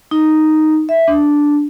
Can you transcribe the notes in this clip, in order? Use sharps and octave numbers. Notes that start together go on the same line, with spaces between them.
D#4
E5
D4